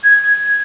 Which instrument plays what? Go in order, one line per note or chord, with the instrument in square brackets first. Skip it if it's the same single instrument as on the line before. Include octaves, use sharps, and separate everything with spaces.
[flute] G#6